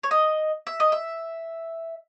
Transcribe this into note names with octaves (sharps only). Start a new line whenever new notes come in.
C#5
D#5
E5
D#5
E5